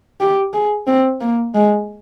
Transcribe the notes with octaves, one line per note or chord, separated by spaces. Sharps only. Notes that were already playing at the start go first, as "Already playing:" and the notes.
G4
G#4
C4
A#3
G#3